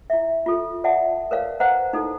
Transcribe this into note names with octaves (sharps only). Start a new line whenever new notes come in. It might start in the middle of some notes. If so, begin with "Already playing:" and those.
E4 E5
F4 A4
D5 E5 F#5 A5
A#4 B4 C#5 D5 F5
B4 C5 D#5 F5 F#5 A#5
D#4 E4 A4